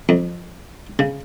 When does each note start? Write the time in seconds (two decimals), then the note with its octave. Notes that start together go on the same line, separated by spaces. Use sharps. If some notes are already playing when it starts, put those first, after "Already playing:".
0.09 F2
0.99 C#3